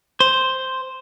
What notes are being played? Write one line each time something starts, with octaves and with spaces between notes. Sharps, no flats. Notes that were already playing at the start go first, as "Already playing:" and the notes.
C5